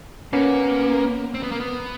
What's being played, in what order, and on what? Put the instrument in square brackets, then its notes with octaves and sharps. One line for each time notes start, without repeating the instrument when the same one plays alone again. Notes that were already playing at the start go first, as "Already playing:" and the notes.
[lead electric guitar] A#3 [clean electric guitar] B3 C#4
[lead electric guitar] C4
B3
A#3
B3